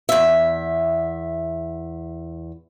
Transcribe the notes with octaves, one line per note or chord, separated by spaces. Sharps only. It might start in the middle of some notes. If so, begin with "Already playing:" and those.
E2 E5